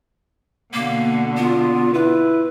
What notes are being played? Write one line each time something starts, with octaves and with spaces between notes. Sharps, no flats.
B2 D3 A#3
B3 F4
E4 B4